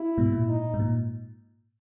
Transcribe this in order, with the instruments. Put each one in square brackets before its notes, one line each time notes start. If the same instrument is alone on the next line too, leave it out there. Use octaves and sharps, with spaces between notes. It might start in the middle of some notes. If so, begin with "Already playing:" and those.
Already playing: [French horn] E4
[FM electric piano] G#2 B2
A#2
[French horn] D#4
[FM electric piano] G#2
A#2